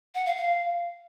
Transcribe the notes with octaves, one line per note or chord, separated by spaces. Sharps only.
F#5
F5
F5